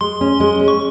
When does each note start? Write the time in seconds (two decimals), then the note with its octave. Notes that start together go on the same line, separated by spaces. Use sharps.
0.01 G#3 C6
0.21 C#4
0.40 G#3
0.60 C#4
0.68 C#6